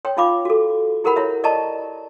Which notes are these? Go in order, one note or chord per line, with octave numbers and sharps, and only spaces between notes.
C#5 G5
D#4 F4 F5 B5 D6
F#4 A4
E4 G4 A#4 C5 F#5 B5
E4 C#5 E5
D5 D#5 A5 A#5 C#6